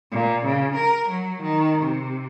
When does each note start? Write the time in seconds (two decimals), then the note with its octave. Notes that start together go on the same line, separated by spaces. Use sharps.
0.12 A#2
0.46 C#3
0.75 A#4
1.09 F#3
1.43 D#3
1.83 C3